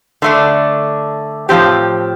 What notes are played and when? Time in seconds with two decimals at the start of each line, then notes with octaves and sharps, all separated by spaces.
0.22 D3 A3 D4
1.49 A2 F3 C4 G4